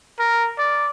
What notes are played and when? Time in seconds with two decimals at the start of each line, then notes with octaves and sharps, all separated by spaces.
0.19 A#4
0.58 D5